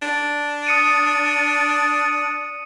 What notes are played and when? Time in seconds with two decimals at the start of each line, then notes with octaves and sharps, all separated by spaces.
0.02 D4
0.67 D#6 C#7 D#7